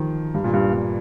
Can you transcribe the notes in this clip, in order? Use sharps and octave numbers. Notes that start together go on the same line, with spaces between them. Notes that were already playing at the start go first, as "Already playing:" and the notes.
Already playing: D#3 F3
G2
A#2
G2
G2